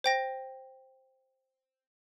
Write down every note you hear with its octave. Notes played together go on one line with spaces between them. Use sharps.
C5 G5 A#6